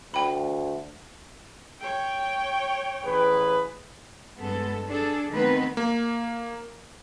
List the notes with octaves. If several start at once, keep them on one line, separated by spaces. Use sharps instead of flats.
D2 G5 B5
C#5 G5
A1 G#4 B4
G2 G#3 B3 A4
D4 G#4 A4
D#3 A3 B3 C4 D#4 B4
A#3